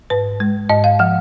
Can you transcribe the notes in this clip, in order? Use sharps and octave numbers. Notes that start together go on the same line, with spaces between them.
G#2 B4
G#3
G#2 D#5
F5
F3 F#5